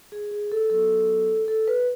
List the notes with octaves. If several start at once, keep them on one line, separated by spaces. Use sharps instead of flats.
G#4
G#4
A4
F#3 B3 F#4 A4
A4
B4